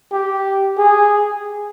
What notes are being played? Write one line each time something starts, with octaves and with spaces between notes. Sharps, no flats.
G4
G#4